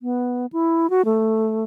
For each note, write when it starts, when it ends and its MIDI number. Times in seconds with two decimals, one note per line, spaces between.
0.01 0.46 59
0.53 0.90 64
0.90 1.02 66
1.05 1.64 57